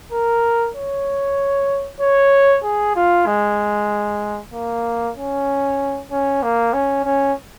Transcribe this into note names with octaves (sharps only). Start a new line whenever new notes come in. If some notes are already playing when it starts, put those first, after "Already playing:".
A#4
C#5
C#5
G#4
F4
G#3
A#3
C#4
C#4
A#3
C#4
C#4